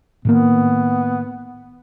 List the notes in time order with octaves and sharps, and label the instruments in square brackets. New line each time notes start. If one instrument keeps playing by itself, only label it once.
[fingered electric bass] A2 D#3 A#3 [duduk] B3